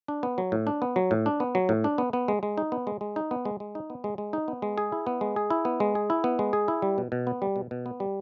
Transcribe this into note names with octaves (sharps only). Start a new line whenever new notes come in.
D4
B3
F#3
A2
D4
B3
F#3
A2
D4
B3
F#3
A2
D4
B3
B3
G#3
G#3
D#4
B3
G#3
G#3
D#4
B3
G#3
G#3
D#4
B3
G#3
G#3
D#4
B3
G#3
G#4
E4
B3
G#3
G#4
E4
B3
G#3
G#4
E4
B3
G#3
G#4
E4
G3
B2
B2
B3
G3
B2
B2
B3
G3